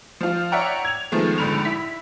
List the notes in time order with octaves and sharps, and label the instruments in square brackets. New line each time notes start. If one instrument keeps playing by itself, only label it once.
[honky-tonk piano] F3 F4
C#5 D5 E5 F#5 G5 A#5
G#6 F7
D#3 F3 G#3 A3 B3
A#1 G#2 D3 B5 F7
E4 B6